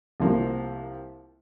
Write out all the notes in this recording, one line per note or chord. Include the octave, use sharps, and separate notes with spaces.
C2 C3 F3 A#3